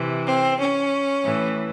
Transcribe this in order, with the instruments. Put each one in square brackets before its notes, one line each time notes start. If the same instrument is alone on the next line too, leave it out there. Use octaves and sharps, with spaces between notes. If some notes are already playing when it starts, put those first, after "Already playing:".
Already playing: [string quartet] C3 E3
C4
C#4
A2 E3